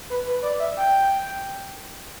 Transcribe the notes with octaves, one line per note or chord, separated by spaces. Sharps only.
B4
B4
D5
E5
G5